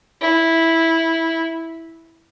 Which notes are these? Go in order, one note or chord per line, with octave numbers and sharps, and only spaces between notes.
E4